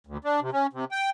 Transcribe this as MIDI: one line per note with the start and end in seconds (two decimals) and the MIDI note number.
0.07 0.18 38
0.25 0.40 62
0.41 0.50 48
0.53 0.67 61
0.73 0.85 48
0.91 1.10 79